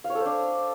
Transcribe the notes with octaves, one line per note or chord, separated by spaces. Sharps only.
F5
C#5
A4
C5
D4